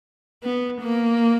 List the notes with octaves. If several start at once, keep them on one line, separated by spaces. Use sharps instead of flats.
B3
A#3